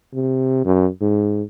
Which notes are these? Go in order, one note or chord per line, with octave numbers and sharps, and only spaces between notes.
C3
F#2
G#2